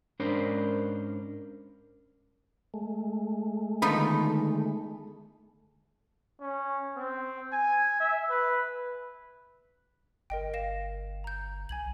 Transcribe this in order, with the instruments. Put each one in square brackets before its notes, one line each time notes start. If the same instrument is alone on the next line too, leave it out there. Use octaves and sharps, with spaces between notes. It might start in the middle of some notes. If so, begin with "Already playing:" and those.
[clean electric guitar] G#2 C#4 D4 A#4 C5 B5
[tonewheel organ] G#3 A3
[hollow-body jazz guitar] D3 D#3 A4 [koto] B3 D#4 F4 [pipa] B5
[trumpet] C#4
C4
G#5
E5
B4
[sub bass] G1 [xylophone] A#4 D#5 G5
[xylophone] F5 A#6 E7
A#5 G6
[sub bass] B1 [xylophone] G#5 G#6 F#7